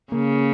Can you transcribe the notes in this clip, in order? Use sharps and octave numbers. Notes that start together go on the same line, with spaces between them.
C#3 A#3